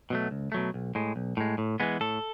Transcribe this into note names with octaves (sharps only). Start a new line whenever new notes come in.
B2 F#3 A3
C#2
B2 F#3 A3
B1
A2 G#3
B1
A2 G#3
A2
E3 G#3 B3
A2 A4